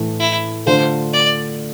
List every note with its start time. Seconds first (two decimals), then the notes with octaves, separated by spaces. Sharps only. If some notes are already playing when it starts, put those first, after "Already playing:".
Already playing: A2 E3 A3
0.20 E4
0.66 D3 A3 D4 F4 C5
1.13 D5